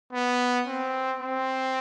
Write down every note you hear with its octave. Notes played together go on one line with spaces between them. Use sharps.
B3
C4
C4